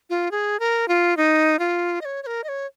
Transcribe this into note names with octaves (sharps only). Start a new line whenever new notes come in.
F4
G#4
A#4
F4
D#4
F4
D#5
C#5
C#5
A#4
D#5
C#5